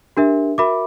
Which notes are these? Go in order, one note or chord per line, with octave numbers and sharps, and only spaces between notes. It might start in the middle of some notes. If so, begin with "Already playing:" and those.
D4 G4 A#4 E5
F#4 A#4 E5 B5 D6